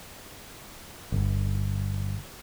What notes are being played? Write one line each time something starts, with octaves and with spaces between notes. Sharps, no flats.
G1